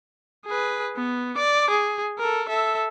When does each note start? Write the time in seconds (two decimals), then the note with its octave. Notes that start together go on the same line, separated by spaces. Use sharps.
0.46 G#4 B4
0.96 B3
1.36 D5 D6
1.70 G#4
2.19 A4 A#4
2.49 A4 E5